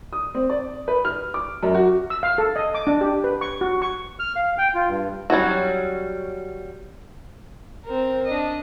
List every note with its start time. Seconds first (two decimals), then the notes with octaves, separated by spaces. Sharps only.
0.13 D#6
0.35 C4
0.50 D5
0.88 B4
1.05 F6
1.34 D6
1.63 F#2
1.75 F#4
2.10 E6
2.23 F5
2.38 A4
2.56 D#5
2.74 D6
2.87 D4
3.01 G4
3.24 B4
3.41 C#6
3.61 F#4
3.82 C#6
4.19 F6
4.36 F5
4.58 G5
4.74 F4
4.89 G2
5.30 F#3 G3 C#4 F#4
7.85 C4 A#4
8.26 D4 D#5